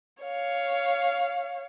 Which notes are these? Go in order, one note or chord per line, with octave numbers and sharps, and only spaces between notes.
C#5 F5